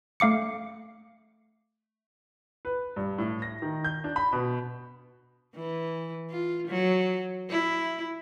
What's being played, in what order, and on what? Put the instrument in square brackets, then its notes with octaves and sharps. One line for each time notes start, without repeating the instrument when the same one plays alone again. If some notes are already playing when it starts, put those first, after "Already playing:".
[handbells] A3 F5 D6 C#7
[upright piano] B4
G2
A2
A#6
D#3
G6
D4
B5
B2
[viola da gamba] E3
F4
F#3
E4